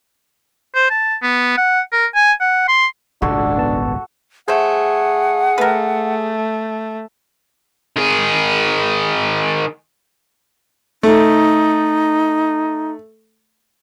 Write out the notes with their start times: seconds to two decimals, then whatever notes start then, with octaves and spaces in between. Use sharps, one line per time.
0.75 C5
0.90 A5
1.22 B3
1.57 F#5
1.92 A#4
2.15 G#5
2.41 F#5
2.68 C6
3.22 D#1 G#1 C#2 D4 F#4 A4
3.56 G1 B3 A5
4.48 A3 G#4 C5 F#5
5.58 A3 A#4 B4
7.96 D#3 G#4
11.03 A3 D#4